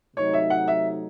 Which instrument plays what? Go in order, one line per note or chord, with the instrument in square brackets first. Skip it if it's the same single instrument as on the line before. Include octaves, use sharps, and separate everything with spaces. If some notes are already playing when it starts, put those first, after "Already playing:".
[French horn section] C3 F#3 A3 D#4 [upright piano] C#5
[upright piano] E5
F#5
E5